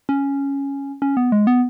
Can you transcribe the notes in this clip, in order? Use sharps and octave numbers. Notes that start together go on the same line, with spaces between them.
C#4
C#4
B3
G#3
B3